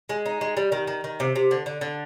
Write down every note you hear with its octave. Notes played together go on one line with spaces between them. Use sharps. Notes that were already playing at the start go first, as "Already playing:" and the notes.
G#3
D#4
G#3
G3
D#3
D#3
D#3
C3
C3
D3
D3
D3